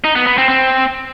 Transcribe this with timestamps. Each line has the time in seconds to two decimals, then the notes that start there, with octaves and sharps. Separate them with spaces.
0.04 D#4
0.15 B3
0.27 B3
0.38 C4
0.49 C4